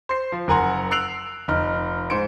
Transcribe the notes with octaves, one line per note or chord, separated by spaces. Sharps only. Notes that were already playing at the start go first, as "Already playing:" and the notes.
C5 C7
F3
F#1 A#4 F#5 G#5 A#5 C6
E6 F#6 C7 D7 F7 F#7
F1 D#4 F6
G#2 C5 C#7 D7